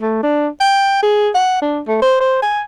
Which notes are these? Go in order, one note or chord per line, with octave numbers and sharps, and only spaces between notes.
A3
D4
G5
G#4
F#5
D4
A3
C5
C5
G#5